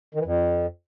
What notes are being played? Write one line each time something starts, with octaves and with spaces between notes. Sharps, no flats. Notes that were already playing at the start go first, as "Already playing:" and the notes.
D#3
E3
F2